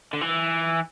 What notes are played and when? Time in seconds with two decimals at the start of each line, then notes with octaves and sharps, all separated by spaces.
0.13 D3
0.21 E3